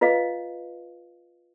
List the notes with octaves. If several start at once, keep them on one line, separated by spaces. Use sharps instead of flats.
F4 B4 D#5 F5